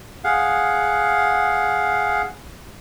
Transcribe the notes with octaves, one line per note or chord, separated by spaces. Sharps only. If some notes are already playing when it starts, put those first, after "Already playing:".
G#4 F5 F#5